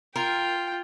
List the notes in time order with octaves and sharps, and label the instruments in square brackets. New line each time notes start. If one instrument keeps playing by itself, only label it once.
[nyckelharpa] F4 [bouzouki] A#4 [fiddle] G5